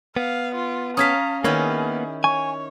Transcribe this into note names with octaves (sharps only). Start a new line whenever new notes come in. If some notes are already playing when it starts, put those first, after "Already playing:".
B3 F5
F4
C#4 F5 A5 A#5 D#6 G#6 B6
D#3 A#3 B3 C#4 E4 G#4 D5 G#6
C#5 G#5 C#6